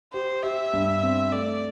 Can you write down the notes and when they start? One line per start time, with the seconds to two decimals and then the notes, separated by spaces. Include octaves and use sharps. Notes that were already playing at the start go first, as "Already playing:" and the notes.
0.13 G4 C5
0.43 G4 E5
0.73 G2
1.03 C4
1.32 A3 D5